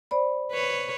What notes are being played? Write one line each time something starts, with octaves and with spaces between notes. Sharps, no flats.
C5 D5 B5
B4 C#5